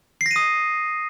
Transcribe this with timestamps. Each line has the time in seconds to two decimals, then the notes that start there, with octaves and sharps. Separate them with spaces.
0.21 C7
0.26 A#6
0.31 D#7
0.36 D#6